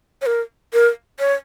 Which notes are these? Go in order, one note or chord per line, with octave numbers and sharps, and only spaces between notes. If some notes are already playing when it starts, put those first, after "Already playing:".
C#5
A#4
A#4
C#5